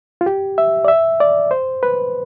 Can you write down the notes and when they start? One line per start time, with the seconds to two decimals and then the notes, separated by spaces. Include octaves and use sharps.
0.21 F4
0.26 G4
0.58 E5
0.85 D5
0.88 E5
1.20 D5
1.51 C5
1.83 B4